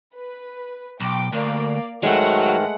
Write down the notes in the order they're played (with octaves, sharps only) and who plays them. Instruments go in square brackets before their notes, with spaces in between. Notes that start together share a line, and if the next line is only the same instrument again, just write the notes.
[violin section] B4
[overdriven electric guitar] B1 [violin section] G5 D6
[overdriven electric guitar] D2 [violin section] A#3 D5 F5
[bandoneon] G#2 D#3 [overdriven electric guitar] F#3 [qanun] G#3 A3 [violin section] B4 F#5